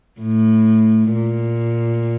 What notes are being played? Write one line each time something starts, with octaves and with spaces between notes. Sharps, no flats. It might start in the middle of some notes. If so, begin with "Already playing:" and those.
A2
A#2